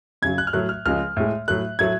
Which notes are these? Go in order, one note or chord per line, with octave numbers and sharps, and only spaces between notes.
F#2 C#3 F#3 G#6
F#6
F6
A2 F#3 A3 F#6
F6
C#2 C#3 F3 G#3 F6
A2 G#3
A2 F#3 A3 F#6
A2 F#3 A3 G#6